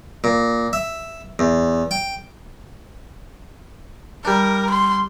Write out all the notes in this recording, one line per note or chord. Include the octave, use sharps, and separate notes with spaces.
A#2
E5
E2
G5
G3 D4 A#4
C6